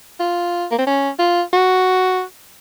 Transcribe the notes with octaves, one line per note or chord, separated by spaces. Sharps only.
F4
A#3
C4
C#4
F4
F#4